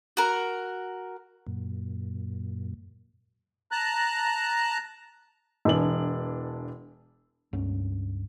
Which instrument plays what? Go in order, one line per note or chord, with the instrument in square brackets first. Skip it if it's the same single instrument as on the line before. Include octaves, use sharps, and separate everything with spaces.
[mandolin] F#4 A#4
[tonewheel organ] F#2 A#2
[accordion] A5 A#5 F#6
[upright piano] E1 E3 D4 F#7
[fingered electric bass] C#2 G2 C#4